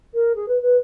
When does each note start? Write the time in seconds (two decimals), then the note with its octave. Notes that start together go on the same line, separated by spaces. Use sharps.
0.14 A#4
0.35 G#4
0.48 B4
0.62 B4